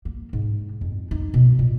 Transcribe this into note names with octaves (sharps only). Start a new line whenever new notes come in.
A#3
G#2
F2
D#4
B2
A#2